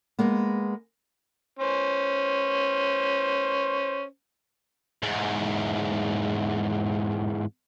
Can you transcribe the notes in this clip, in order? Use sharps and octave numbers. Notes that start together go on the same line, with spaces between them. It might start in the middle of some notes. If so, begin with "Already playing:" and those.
G#3 A#3 B3
C#4 C5
E2 G#2